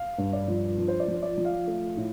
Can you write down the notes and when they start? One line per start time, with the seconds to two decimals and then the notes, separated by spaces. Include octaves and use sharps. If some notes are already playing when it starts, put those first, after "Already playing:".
Already playing: F5
0.18 G2
0.33 D5
0.48 F3
0.78 F3
0.88 C5
1.00 D5
1.08 F3
1.22 D5
1.38 F3
1.45 F5
1.68 A3
1.97 A2